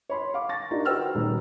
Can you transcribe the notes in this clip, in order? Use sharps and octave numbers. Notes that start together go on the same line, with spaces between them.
C#5 B5 C6
F5 D6
C#6 A6 A#6
D4 D#4 F4 G4 A#4 D5
F#4 B4 C5 G5 E6 F6
D#1 B2 D#3 B4